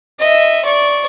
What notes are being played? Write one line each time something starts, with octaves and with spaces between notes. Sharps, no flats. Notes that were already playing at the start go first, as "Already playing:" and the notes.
D#5 E5
D5 C#6